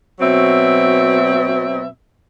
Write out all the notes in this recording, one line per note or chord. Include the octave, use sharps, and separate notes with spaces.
B2 F#3 C4 E5